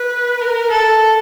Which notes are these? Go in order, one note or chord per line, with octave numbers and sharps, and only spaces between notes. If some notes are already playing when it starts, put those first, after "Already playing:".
Already playing: B4
A#4
A4